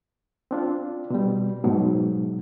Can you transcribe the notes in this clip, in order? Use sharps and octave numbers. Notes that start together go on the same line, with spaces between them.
C4 D4 F4
B2 G3
G#2 B2 F#3